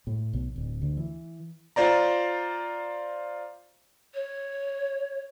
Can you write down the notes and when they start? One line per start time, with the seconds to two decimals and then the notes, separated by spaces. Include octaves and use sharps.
0.07 A2
0.33 B1
0.56 D1
0.82 D2
0.97 E3
1.76 F4 C5 D5 A#5
4.14 C#5